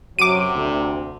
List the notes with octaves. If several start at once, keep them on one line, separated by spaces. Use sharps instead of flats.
F#2 C3 F#3 D6 D#7
D2